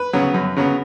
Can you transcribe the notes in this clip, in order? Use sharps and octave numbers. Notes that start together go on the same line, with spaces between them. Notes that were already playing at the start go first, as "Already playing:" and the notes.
Already playing: B4
C#3 F#3 B3
F#2
C#3 F#3 B3